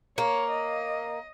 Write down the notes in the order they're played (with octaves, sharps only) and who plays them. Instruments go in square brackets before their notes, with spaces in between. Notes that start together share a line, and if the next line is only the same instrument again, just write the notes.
[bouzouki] A#3 [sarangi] C#5
[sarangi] D#5